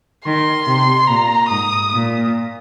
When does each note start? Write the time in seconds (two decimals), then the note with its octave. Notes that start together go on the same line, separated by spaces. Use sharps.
0.26 D#3 C6
0.67 C3
1.08 A#2 A#5
1.49 G#2 D#6
1.91 A#2